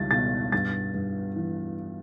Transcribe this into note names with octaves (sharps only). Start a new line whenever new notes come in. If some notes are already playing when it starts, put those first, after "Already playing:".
Already playing: C#2 G3 A6
B2 A6
G2 A6
G2
E3